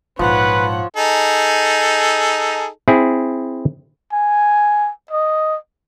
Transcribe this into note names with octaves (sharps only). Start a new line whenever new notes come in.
A#1 G#2 F3 B4 C#5 F#5
D#4 G#4 A4
C4 E4 G#4
G#5
D#5